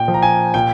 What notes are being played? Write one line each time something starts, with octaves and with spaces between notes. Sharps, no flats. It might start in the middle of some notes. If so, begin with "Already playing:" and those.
Already playing: A#2 G5
F3
A#5
G#5
A#2 G5